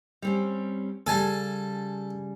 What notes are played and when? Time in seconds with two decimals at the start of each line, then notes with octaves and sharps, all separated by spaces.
0.22 G3 C4 C#4
1.07 C#3 G3 A4 G#5 A5